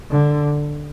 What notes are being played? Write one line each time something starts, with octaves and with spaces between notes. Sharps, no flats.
D3